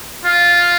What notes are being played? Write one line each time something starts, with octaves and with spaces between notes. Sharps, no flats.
F4